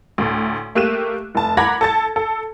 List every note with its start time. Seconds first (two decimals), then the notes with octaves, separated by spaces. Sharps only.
0.18 D2 A2
0.75 A3 A#3 G4 F#6 D#7 E7
1.35 F1 A5
1.57 F#5 A#5 B5 D6 G#6 A#6
1.81 A4 A5 A6
2.16 A4